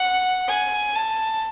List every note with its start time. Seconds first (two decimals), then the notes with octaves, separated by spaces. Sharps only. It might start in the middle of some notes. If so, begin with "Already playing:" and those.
Already playing: F#5
0.48 G#5
0.96 A5